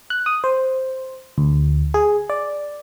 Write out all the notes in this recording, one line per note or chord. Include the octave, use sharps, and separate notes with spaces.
F#6
D#6
C5
D2
G#4
D5